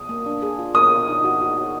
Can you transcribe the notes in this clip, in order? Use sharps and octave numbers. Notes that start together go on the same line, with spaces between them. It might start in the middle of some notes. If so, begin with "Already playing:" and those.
Already playing: D#6
A#3
D4
G#4
F4
A#4 D#6
A#4
D#4
F#4
F#4
F#4